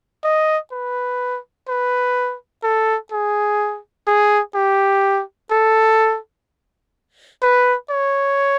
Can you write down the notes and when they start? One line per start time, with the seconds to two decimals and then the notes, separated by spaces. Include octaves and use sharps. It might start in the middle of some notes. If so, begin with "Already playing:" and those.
0.24 D#5
0.72 B4
1.68 B4
2.63 A4
3.12 G#4
4.07 G#4
4.55 G4
5.51 A4
7.42 B4
7.90 C#5